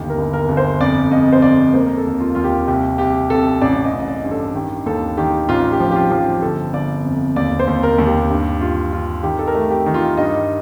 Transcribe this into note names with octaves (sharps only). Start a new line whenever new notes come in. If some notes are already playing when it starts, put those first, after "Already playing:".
Already playing: G1 D#2 D#3 G4
A#4
G1
A#4
G1
C5
F2 D5
F2 D#5
C5
F2 D5
A#3 C5
A#4
A4
D#2
F4
D#2 F4
G4
C2 G4
C2 G4
C2 A4
A1 D5
D#5
A1
D#5
D5
G2
A4
D#3 G4
D#2 A4
D#3 G4
A1 F4
G4
F3
G4
F4
F3 F4
G4
G1 A4
G1 D5
F2
D#2 D5
C5
D#2
A#4
D#2
G4
G2
G2 F4
G2 F4
D#3 G4
A4
A#4
A3
G4
D#3
F4
G2 D#5